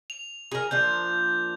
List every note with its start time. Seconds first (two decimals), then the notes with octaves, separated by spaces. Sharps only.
0.10 F7
0.51 G#4 A#4
0.71 F3 A#3 D4 G6